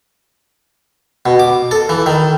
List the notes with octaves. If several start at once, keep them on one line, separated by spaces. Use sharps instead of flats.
B2
D6
A4
E3
D#3